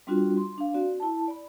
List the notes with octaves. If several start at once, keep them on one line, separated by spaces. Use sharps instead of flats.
G3 C4 D4 F4 F#4
C6
D4 F5
C4 F#4 D5
E4 A5
D5 B5